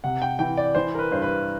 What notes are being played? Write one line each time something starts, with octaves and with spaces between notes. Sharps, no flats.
C3 F#5
G5
E3 G5
D5
E3 C5
A#4
B4
G2 C5
B4